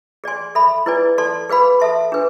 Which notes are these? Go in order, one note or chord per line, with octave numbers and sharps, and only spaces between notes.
G#4 D5 G#5 C6
A4 E5 B5
E4 G#4 B4 D5 G#5
A4 D5 A5 C6
G#4 B4 F5 B5
A4 E5 A5 C6
D4 G#4 B4